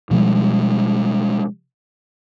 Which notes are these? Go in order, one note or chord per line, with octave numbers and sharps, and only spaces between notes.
B2 F3 G3 G#3